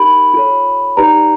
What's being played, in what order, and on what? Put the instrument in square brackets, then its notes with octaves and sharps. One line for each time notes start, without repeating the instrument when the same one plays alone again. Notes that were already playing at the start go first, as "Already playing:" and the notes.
Already playing: [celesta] D#4 G4 A#4 B5
F4 A4 C#5
D#4 G4 B4 D5 A#5